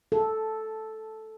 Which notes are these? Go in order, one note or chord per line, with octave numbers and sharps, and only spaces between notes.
A4